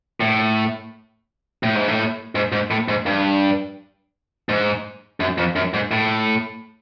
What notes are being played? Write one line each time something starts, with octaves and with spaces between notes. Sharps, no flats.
A2
A2
G#2
A2
G#2
G#2
A2
G#2
G2
G#2
F#2
F2
F#2
G#2
A2